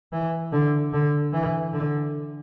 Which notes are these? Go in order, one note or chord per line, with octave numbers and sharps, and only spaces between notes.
E3
D3
D3
E3
D3